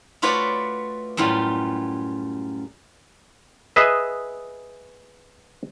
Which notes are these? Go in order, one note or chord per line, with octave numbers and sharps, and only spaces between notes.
A3 F4 F#4 B4 C#5 D5
F#2 A2 G3 F4
G#4 B4 D#5 E5